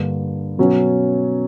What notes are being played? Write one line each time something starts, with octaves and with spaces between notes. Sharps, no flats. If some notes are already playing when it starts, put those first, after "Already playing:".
Already playing: G2 D3 A#3
B2 F#3 C#4